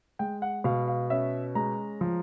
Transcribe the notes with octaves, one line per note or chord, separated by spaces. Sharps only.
G#3 G5
F#5
B2 F5
F5
C#4 E5
G#3 A#5
F3